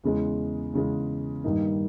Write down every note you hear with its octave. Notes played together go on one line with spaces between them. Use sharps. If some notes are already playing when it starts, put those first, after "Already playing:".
E2 C#3 G#3
E2 C#3 G#3
G2 D#3 A#3 D#4